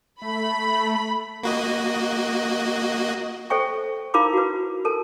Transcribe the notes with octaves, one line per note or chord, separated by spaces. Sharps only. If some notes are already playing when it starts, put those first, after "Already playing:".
A3 B5
A#3 F#4 D#5
A4 C5 E5 G5 C#6
D#4 E4 A#4 F5 B5 D6
F#4 B4
A4 A#4 A5